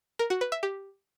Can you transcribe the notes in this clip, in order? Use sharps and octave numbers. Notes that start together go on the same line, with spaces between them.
A#4
F#4
B4
E5
G4